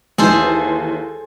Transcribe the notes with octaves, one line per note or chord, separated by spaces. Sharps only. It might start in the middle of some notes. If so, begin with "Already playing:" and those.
D#2 E3 G#4 A4 C5